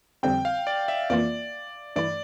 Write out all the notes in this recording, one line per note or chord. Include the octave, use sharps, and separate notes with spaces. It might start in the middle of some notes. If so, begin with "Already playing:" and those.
F2 D3 G3 C4 G5
F5
D5
E5
F2 E3 A#3 F4 D5
G2 E3 A3 E4 D5